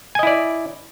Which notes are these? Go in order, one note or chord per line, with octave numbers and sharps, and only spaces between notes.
E4 D5 D#5 G#5